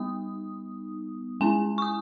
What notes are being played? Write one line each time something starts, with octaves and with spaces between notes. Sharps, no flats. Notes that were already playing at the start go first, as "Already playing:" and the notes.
Already playing: G3 B3 D#4 D#6
G#3 C#4 E4 G#5
C#6
D#6